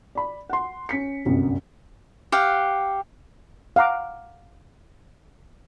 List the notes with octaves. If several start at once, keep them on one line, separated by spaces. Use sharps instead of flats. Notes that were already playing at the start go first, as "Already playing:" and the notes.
D5 B5
F#5 C6
C#4 B6 C#7
G1 C2 F#2
G4 F5 F#5
F5 F#5 A#5 D6